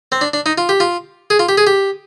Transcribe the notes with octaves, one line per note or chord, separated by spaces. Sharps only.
C4
D4
D4
D#4
F4
G4
F4
G#4
F4
G4
G#4
G4